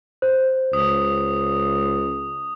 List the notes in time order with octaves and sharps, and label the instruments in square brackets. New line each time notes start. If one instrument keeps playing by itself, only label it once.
[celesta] C5
[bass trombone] C#2 [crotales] D#6